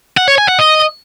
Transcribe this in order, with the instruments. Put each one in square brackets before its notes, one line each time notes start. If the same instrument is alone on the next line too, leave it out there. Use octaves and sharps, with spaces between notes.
[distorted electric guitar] F#5
C#5
G#5
F#5
D#5